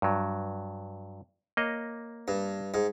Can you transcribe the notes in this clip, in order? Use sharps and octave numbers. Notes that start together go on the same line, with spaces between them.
G2 F#3
A#3 C#5 D#5
G2
G#2